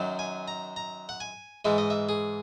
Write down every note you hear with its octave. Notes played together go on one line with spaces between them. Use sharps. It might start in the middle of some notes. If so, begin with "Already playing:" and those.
Already playing: F#2 D#3 F#3
G#5
A#5
A#5
F#5
G#5
G#2 E3 G#3 E5
D#5
E5
G#4